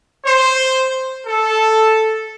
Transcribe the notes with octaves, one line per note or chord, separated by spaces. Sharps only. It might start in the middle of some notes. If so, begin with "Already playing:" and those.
C5
A4